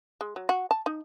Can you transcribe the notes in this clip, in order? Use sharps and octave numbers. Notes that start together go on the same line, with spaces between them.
G#3
F#3
F#4
A5
D#4